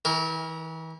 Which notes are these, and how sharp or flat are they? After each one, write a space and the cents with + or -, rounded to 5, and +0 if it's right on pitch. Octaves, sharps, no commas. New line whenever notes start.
E3 -35 A#4 +0